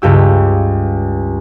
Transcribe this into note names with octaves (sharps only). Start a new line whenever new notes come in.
C#2 G2 G4 E6